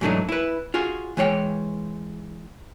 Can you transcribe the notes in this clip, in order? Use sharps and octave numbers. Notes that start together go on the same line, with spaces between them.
G#2 E3 F#3 A3 D4 D#4
E4 B4
F4 F#4 G#4
E3 G#3 C#5 F5 G5